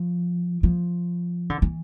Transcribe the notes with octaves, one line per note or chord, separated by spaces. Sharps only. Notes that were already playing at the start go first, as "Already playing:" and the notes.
Already playing: F3
F3
D3
E3